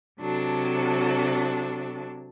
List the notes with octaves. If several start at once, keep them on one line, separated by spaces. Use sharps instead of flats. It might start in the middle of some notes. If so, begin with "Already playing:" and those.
C3 F#3 D4 A4